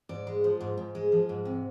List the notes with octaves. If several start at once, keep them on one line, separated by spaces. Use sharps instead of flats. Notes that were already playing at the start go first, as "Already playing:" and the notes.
G#2 D5
G#3
F3
G#2
G#2
G#3
F3
G#2
C3